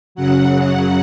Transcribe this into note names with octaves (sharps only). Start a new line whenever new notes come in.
F#2 C#3 F#3 F#5